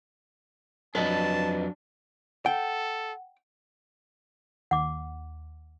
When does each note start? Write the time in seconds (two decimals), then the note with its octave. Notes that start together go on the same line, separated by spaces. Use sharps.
0.95 F2 F#3 D4 B4 D#5 A5
2.46 A4 F#5 G5
4.71 D#2 F#5 D6